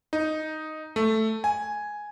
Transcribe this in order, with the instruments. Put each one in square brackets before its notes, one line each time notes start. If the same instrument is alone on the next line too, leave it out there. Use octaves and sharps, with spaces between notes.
[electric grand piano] D#4
A3
G#5